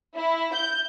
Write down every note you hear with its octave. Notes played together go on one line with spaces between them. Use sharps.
E4
G6